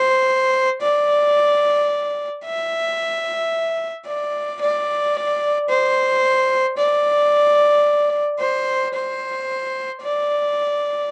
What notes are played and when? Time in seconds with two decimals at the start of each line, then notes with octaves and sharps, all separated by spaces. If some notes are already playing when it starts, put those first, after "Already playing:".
Already playing: C5
0.82 D5
2.45 E5
4.06 D5
4.61 D5
5.69 C5
6.77 D5
8.39 C5
8.94 C5
10.02 D5